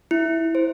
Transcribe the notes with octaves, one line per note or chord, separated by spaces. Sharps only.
E4
C5